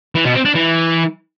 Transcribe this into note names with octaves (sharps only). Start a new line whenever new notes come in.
E3
B2
C4
D4
E3